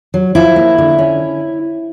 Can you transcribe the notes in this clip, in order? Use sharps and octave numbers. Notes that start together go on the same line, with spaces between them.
F#3
F3 E4
A#3
D3
C#4